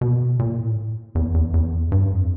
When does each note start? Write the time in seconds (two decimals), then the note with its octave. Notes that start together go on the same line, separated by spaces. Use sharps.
0.01 B2
0.39 A#2
0.58 A2
1.15 E2
1.34 E2
1.54 E2
1.92 G2
2.11 F2